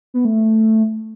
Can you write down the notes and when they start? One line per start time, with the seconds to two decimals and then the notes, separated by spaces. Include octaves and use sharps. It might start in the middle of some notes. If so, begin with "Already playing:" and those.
0.14 B3
0.25 A3